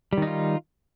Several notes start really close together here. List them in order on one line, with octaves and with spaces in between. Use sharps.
G3 D#3 D#4 F4